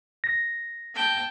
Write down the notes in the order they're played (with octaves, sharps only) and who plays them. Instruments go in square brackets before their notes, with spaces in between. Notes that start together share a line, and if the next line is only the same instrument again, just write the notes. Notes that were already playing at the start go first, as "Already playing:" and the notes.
[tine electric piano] A#6
[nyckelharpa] G5 A5